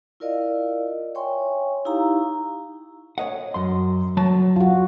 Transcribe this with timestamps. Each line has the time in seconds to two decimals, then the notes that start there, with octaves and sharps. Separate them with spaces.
0.20 E4 F4 A#4 D5 D#5 F5
1.15 C#5 E5 G5 G#5 C6 C#6
1.85 D#4 E4 G4 F5 A#5
3.18 C#5 D#5 F#5
3.54 F#2 C6
4.17 F#3 A5
4.56 F4 F#4